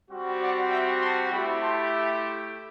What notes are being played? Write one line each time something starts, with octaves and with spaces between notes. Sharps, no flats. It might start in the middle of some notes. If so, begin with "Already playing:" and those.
G3 C4 F#4
D5 F#5
E5 G5
A5 C6
A3 E4 G4 G5 B5
A5 C6